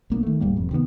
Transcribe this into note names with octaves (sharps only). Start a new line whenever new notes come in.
B1 A#3 B3 D4
D#3 A3
D#1 G#2 G3 A#3
E1 F2
C3 D#3 F#3 B3